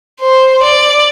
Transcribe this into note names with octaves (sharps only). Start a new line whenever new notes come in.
C5
D5